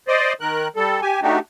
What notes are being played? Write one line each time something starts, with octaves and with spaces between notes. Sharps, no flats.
C5 D5 D#5
D#3 A#4 F#6
G3 A4
G4 G#5
A3 D4 D#4 F#4 G4